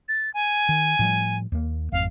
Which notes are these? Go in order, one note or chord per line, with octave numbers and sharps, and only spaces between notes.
A6
G#5
D#3
A2 F3 G3
D#2 A#3
G#1 F2 F5